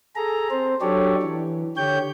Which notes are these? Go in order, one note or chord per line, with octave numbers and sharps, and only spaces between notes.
G#4 A4 A#5
C4 C5
F#3 D4 G4 A4 C#5 D5
E3
D3 G4 C#5 G5 G6